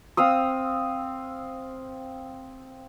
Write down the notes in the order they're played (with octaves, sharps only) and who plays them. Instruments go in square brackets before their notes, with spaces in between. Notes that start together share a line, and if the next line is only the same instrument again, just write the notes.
[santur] C4 F5 D#6 E6